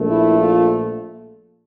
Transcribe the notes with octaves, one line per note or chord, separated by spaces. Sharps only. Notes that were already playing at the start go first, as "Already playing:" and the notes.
Already playing: A#1 A#2 A3
E4
F4